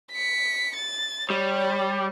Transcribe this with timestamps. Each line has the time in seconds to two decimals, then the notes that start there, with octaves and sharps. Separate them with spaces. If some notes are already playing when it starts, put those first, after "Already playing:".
0.12 B6 C#7
0.76 A6
1.30 G3 C#5